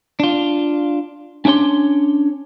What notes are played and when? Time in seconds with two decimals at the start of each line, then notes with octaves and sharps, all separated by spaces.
0.20 D4 F4
1.45 C#4 D4 E4 C#5 C6